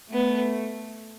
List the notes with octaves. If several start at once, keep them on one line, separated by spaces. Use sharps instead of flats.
A3 B3